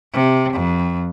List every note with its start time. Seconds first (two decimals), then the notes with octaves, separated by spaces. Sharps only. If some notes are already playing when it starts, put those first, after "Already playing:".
0.14 C3
0.53 F2